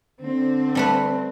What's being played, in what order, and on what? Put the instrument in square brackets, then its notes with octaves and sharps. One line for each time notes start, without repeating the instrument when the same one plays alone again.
[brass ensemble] D3 [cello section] C4
[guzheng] G3 A3 B4